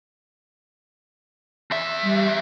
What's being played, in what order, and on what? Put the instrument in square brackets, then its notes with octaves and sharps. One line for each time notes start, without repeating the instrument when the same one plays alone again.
[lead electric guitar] E2 E5
[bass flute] G3